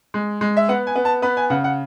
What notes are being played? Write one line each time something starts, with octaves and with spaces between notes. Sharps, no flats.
G#3
G#3
E5
B3 F#5
G#5
B3
A5
B3 B5
G#5
C#3 F#5
F#5